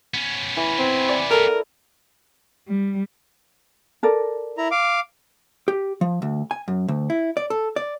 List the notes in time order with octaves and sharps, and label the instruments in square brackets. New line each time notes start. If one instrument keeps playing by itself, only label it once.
[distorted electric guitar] B3 C#4
[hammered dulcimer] E3
[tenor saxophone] C4
[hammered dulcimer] D5
[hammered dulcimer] A4 [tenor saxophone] A#4
[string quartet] G3
[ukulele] A4 A#4 D5
[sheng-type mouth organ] E4 A#5
F5 D6
[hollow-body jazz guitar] G4
F3
D2
G#5
F#2
D2
E4
D5
A4
D5